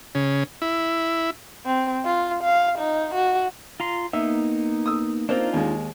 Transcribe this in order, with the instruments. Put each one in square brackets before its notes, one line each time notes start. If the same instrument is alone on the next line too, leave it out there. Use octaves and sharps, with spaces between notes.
[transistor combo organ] C#3
E4
[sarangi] C4
F4
F5
D#4
F#4
[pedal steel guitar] F4 A#5 C6
[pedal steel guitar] A#3 B3 D#4 [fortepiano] E5
[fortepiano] D#6 E6
[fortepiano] A#3 C4 [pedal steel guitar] D4 D#4 F4
[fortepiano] D#2 G#3